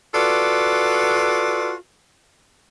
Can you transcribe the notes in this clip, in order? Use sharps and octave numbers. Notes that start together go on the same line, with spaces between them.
F4 F#4 A4 B4 D5